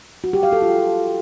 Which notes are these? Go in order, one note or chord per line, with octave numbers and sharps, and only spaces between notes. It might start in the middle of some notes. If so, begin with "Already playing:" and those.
F#4
G4
F5
A4
F4